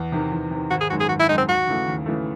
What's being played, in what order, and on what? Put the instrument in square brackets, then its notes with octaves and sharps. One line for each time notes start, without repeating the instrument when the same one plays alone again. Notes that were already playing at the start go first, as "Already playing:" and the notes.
Already playing: [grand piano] E2
C3 D#3
E2
C3 D#3
[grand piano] G#1 [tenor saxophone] F#4
[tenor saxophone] G#4
[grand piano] F#2 D#3 G#3 [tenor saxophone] F#4
[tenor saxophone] G#4
[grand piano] G#1 [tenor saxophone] F#4
[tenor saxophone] E4
[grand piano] F#2 D#3 G#3 [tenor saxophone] D#4
[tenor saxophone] C4
[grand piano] D#2 [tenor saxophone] F#4
[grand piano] C#3 E3 A3
D#2
C#3 E3 A3